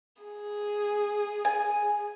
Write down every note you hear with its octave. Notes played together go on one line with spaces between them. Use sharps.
G#4
G#5